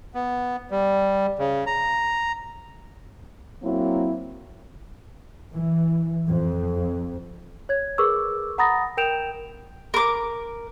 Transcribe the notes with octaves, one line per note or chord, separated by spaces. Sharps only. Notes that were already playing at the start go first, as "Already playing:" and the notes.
B3
G3
C#3
A#5
F#3 A#3 C4 E4
E3
F2
C#5 G#6
G#4 A#4 B4 C#6 D6 E6
F#5 A#5 B5 D#6 A6 A#6
A#4 G5 G6 D7 E7 F7
A#4 D6